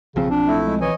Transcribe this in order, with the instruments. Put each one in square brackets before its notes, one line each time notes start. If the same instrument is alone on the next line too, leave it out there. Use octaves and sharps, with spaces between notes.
[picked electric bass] B1 F3 C4 [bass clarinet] C#3
[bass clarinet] D4
[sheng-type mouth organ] A3 E4
[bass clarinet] G#3
[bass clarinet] E3 [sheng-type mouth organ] C#5 D#5 G#5